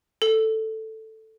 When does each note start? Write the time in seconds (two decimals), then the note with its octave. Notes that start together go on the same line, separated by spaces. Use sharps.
0.22 A4